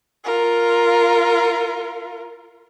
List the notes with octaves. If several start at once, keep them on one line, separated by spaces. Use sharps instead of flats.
F4 A#4